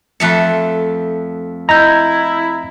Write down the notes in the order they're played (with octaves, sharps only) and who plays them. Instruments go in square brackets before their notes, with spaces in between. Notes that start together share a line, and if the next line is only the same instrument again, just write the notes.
[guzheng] F2 A3 A5 [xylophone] F#6 C#7
[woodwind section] E4 [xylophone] D#5 G6 [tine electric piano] A#5